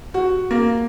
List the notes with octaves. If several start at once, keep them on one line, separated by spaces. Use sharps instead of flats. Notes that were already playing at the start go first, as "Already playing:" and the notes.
F#4
A#3